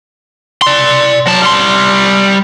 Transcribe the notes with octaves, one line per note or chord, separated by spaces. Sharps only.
D5 C6
F#3 A5
G3 C6